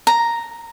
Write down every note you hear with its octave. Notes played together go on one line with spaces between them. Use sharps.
A#5